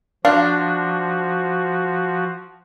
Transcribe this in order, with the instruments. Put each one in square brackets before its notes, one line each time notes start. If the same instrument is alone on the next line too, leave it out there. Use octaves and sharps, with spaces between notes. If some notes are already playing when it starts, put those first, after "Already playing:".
[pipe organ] F3 F#4 [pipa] D4 [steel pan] F5